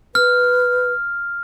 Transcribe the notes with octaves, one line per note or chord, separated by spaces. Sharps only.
B4 F6